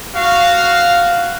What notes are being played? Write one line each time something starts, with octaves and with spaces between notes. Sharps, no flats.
F#4 F5